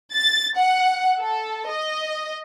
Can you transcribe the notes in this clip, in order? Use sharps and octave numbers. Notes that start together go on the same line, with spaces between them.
A6
F#5
A4
D#5